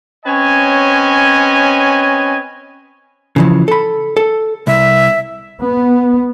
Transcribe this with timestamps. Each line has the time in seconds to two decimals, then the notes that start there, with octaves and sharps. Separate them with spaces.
0.26 C4 C#4 B4 C#5 D#5 G#5
3.36 C#3 E3 F3
3.68 A4 B5
4.17 A4
4.67 C2 E5
5.62 B3